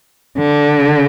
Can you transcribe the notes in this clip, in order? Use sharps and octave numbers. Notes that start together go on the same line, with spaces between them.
D3